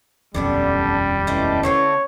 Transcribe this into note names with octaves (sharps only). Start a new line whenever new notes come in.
D#1 B1 F2 D3 G3 B3 C#4 D4
G#3 A3 C#4 E4 B4
D3 A3 C4 C#5